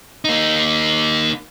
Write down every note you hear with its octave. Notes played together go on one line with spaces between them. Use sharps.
A#3 D#4